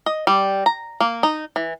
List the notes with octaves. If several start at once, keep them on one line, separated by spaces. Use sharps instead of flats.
D#5
G3
A#5
A#3
D#4
E3